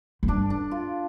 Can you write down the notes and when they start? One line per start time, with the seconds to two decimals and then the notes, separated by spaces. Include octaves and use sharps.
0.23 F2
0.28 G2 D4
0.50 D4
0.71 F4